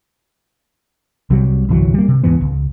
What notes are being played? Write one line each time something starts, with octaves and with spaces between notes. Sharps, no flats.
C2 C3 F#3 G3
G1 C2 E3 F#3
G3 A#3
C3
D#2 G#2 E3 B3
C#2